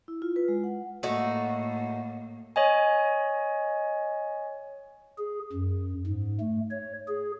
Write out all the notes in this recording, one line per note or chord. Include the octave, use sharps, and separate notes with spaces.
E4
F4
B4
G#3
F#5
A2 A3 A#3 D#4 F#4
C#5 D#5 G#5
G#4
F#2
G#2
A3
C#5
G#4